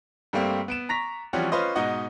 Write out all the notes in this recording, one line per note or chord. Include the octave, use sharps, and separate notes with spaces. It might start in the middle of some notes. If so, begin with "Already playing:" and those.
G2 G3 A3 A#3 C4
B3 D7 E7
A#5 C#6 A#6 B6 F7
E3 F3 G3 C4 C#4 F#4
C#4 F4 B4 C5 D#5
G#2 B2 D#4 D#5 F#5